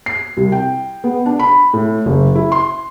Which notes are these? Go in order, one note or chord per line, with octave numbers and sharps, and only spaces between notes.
C7
C2
G5
B3
D4
B5
A2
F#1
E4
C6